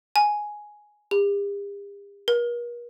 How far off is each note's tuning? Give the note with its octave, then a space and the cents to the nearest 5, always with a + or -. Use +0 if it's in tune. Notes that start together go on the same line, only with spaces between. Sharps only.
G#5 +5
G4 +45
A#4 +45